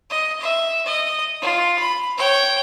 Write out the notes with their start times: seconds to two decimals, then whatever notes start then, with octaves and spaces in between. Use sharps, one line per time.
0.10 D#5
0.41 E5
0.86 D#5
1.42 F4
1.79 B5
2.18 C#5 G5